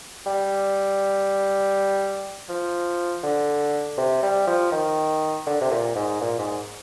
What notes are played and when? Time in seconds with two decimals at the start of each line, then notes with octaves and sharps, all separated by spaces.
0.26 G3
2.49 F3
3.23 D3
3.98 C3
4.22 G3
4.47 F3
4.72 D#3
5.46 D3
5.61 C3
5.71 A#2
5.95 G#2
6.21 A#2
6.39 G#2